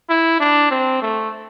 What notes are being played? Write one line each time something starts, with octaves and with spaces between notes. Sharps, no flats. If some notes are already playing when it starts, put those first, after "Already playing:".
E4
D4
C4
A3